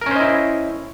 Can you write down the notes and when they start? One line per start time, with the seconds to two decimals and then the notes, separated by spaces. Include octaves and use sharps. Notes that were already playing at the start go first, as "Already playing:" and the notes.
0.01 A#4
0.06 C#4
0.11 C5
0.16 D#5
0.21 E4